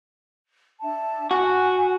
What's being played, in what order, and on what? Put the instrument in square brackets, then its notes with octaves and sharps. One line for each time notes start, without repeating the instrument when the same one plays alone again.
[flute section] D4 E5 A5
[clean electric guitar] F#4 [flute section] F#5 G#5